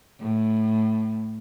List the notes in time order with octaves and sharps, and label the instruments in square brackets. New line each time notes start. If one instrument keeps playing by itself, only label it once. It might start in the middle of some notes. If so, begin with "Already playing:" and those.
[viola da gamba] A2